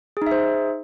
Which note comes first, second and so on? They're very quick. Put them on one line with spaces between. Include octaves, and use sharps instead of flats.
G#4 D#4 E5 C5